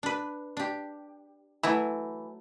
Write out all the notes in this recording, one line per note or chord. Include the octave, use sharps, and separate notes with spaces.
D4 B4
D4 G4
E3 F#3 A3 E4